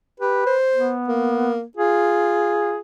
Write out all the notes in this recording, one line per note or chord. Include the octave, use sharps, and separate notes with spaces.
G4 B4
C5
B3
A#3
F4 G#4